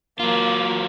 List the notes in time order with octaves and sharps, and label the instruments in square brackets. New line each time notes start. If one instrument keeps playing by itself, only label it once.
[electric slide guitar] F#3 F4 [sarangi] A#3